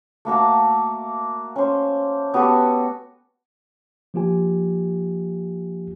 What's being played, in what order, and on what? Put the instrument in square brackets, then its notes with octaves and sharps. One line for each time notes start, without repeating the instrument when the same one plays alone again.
[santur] A3 A#3 F#4 A5
C#4 C5
B3 F#4 G4 A4
[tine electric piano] F3 A#3 F4 G4 G#5